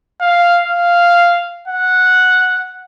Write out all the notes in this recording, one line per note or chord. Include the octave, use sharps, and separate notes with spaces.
F5
F5
F#5